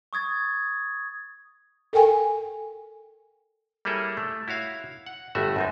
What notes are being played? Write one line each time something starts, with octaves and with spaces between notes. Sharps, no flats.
C#6 D#6 G#6 A6
A4 A#4 G5 G#5
G3 A#3 E4 G#4 A4 C#5
A3
E4 F#4 C#5 F5
F#5
G1 G2 A3 F#4 E5
F#2 C4 D#4